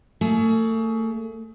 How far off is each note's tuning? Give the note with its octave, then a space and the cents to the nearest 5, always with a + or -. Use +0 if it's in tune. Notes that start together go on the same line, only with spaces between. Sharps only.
A3 +35 G#4 +35